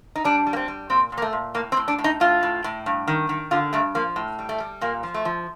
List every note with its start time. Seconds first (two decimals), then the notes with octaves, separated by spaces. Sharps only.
0.15 D#4
0.24 G3 D4
0.46 G3
0.53 A#3
0.56 C4
0.68 G3
0.90 A#2 C4
1.12 A#2
1.17 A#3
1.22 A3
1.33 A#2
1.54 A2 A#3
1.72 C4
1.77 A2
1.88 D4
1.98 A2
2.04 D#4
2.20 A2 F4
2.43 A2
2.64 A2
2.86 G2
3.07 D#3
3.29 D#3
3.51 D3 F4
3.73 G2 A3
3.95 F3 A#3
4.16 A2
4.39 G3
4.49 A3
4.60 G3
4.81 A#2 A#3
5.03 F3
5.14 A3
5.25 F3